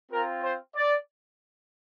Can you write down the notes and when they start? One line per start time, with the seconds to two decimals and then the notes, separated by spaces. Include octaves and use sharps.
0.10 C4 F4 A#4
0.42 C5
0.75 D5